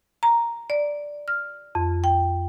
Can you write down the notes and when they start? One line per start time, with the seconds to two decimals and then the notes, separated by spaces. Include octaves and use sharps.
0.23 A#5
0.70 D5
1.28 F6
1.75 F2
2.04 G5